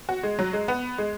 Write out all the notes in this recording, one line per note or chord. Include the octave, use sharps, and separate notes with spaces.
F#4
G#3
F#3
G#3
B3
G#3